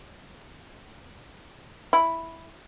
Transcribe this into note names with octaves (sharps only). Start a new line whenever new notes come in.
E4